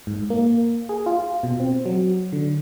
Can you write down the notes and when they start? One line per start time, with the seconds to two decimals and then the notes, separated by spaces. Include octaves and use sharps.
0.07 G#2
0.30 A#3
0.89 G#4
1.06 F4
1.43 B2
1.60 C4
1.86 F#3
2.32 D3